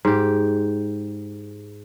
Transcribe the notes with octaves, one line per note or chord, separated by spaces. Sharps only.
G#2 G4